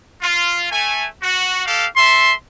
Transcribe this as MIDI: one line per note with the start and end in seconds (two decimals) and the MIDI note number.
0.22 0.66 65
0.70 1.06 57
0.70 1.06 80
1.22 1.65 66
1.65 1.85 67
1.65 1.85 69
1.65 1.85 77
1.96 2.32 69
1.96 2.32 76
1.96 2.32 84